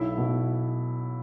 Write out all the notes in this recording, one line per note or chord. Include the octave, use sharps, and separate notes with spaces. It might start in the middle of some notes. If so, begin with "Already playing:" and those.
Already playing: B1 E4
B2